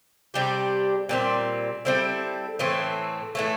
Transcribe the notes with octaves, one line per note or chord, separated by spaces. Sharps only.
C3 G3 D4 G4
A#2 G3 C4
G3 C4 E4 A4
A2 E3 A3 C4
A2 E3 A3